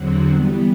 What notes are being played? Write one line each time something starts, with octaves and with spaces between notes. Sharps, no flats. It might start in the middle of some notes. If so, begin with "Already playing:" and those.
Already playing: E2 D3 F#3 C4 F#4
E3 G3 B3